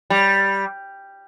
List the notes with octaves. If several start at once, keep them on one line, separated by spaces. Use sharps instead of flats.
G3